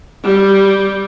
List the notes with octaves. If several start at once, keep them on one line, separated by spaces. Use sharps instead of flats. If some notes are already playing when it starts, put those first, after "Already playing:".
G3